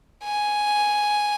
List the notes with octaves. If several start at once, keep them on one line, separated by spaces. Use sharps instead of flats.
G#5